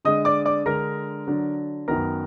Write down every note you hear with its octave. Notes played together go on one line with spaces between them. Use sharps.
D3 G#3 D4 D#5 D#6
D5 D6
D5 D6
D3 G#3 D4 A#4 A#5
D3 F#3 D4
F#2 D#3 F#3 B3 A#4 A#5